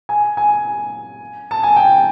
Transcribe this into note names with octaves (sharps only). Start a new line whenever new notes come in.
G#5
G#5
A5
G#5
G5